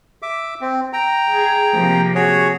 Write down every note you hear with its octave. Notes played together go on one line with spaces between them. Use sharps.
E5 D6
C4
G5 A#5
G#4
C3 F3 A#3
F#4 G#4 C#5